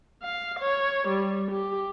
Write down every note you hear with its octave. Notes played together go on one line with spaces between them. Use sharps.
F5
C#5
G3
G4